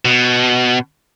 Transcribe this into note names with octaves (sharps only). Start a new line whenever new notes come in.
B2